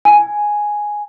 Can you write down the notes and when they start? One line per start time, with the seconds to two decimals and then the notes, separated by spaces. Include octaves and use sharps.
0.05 G#5